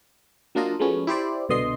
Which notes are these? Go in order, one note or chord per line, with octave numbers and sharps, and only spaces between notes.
F#3 A#3 D4 F4 D#5
F3 G#3 A3 B3 C#4 F#4
E4 G4 C5 D5
C2 B2 D3 D#5 C6 C7